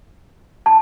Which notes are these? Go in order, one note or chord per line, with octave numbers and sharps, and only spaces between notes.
A5